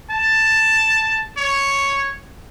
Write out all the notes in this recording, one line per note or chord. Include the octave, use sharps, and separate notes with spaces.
A5
C#5